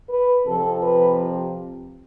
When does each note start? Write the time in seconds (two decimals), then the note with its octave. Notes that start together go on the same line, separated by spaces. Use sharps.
0.10 B4
0.46 F2 C3 F3 A4
0.83 B4